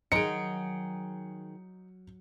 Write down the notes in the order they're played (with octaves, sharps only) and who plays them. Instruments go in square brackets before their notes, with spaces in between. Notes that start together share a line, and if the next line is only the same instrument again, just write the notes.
[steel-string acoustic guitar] D#3 G#4 [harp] F#3 [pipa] G#3 D#4 [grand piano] C#7 D7